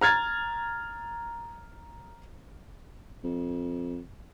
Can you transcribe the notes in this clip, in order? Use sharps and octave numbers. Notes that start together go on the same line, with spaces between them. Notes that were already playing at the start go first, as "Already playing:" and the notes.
A#5 F6 G#6 A6
F2